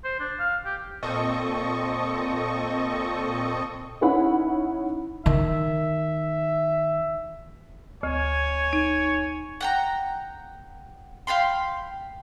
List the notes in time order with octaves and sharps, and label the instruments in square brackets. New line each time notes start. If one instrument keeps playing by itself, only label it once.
[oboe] C5
D4
F5
G4
[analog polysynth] A#2 C4 A4 D#5 C#6 D#6
[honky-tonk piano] C#4 D#4 E4 C#5 F#5 B5
[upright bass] D#3 [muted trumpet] E5
[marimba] D2 [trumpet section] C#5 G#5
[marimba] D#4
[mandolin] F#5 G5 A#5
F5 G5 B5 C6